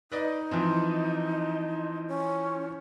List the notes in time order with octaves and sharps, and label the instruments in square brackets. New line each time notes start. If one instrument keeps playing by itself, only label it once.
[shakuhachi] D#4 [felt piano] B4 D5 D#5
[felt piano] E3 F3 C4
[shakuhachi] C#4